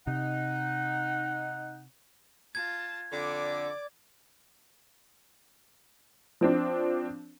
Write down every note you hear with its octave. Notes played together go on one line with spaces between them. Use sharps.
C3 D#4 F#5
F4 A5 G#6
F2 D3 D5 D6
F3 C4 D4